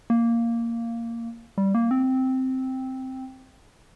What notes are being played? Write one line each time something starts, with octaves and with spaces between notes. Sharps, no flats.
A#3
G3
A#3
C4